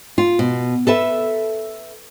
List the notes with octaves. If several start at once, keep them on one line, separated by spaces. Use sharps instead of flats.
F4
B2
A4 B4 E5